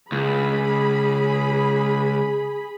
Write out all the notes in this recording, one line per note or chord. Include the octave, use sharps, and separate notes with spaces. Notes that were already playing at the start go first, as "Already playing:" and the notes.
C#2 G#4 B5